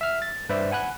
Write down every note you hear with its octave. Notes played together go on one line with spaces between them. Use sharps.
E5 F6
A6
G2 B4 C5 D5 E5
F#5 G#5 B5 F#6